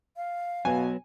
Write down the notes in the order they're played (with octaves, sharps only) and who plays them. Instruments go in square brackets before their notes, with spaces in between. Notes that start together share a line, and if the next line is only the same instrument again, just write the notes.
[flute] F5
[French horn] B2 [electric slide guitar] F#3 B3 [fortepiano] G#5